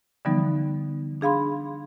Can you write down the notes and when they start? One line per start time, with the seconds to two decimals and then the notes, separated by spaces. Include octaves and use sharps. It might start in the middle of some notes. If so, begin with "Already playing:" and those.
0.25 D3 E3 F3 G3 B3 D#4
1.21 D4 G#4 F5 B5 C6